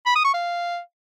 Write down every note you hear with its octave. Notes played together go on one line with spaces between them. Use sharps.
B5
D#6
C#6
F5